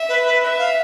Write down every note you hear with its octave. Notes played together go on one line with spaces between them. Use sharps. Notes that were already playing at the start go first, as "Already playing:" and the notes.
Already playing: E5
B4
B4
E5
F5